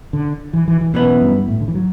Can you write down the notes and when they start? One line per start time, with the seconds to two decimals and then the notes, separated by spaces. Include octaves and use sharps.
0.13 D3
0.53 E3
0.68 E3
0.81 E3
0.94 F#2 B2 E3 B3
1.22 G2
1.48 A2
1.61 D3
1.68 E3
1.75 F#3